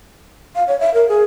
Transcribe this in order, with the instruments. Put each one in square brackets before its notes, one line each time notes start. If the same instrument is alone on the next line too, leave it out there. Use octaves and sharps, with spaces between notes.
[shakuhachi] F5
C#5
E5
A#4
G#4